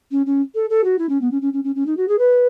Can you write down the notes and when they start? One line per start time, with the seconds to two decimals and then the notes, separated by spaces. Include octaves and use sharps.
0.11 C#4
0.26 C#4
0.55 A4
0.70 A4
0.84 F#4
0.98 E4
1.09 C#4
1.21 B3
1.31 C#4
1.42 C#4
1.53 C#4
1.64 C#4
1.75 C#4
1.86 D#4
1.97 F#4
2.08 G#4
2.18 B4